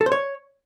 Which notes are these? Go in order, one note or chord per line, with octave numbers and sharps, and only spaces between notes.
A4
C5
C#5